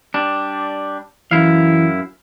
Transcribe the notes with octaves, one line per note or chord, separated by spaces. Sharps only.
G3 D4
F#2 E3 E4 F5